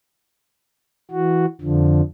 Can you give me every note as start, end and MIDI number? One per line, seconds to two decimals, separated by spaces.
1.11 1.46 52
1.11 1.46 66
1.61 2.02 41
1.61 2.02 50
1.61 2.02 53